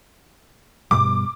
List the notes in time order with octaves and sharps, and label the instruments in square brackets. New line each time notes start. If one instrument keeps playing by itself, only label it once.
[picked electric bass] G2 B2 G3 [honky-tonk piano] D6